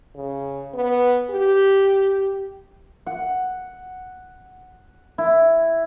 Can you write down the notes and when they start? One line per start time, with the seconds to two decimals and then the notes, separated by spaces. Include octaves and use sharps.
0.15 C#3
0.74 B3
1.30 G4
3.06 F#5
5.18 E4